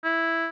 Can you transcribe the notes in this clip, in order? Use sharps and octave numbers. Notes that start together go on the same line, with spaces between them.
E4